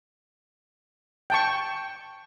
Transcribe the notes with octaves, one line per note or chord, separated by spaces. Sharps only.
G5 A5 C#6